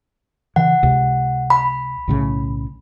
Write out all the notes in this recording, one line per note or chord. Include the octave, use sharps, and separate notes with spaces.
C#3 E3 F#5
C#2 C3
B5
B1 A2 C#3